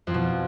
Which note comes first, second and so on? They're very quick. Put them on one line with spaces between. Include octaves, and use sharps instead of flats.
F2 F3 B2